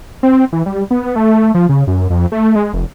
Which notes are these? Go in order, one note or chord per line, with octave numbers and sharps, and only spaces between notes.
C4
E3
G3
B3
A3
F3
C#3
F#2
F2
A3
G#3
F1